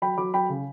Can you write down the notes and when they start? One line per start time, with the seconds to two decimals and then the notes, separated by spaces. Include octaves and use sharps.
0.02 F#3 G5 B5
0.18 F#3 B5 D6
0.34 F#3 G5 B5
0.49 C#3